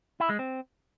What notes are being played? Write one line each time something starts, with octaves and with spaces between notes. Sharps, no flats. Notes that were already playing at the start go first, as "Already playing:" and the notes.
E4
G#3
C4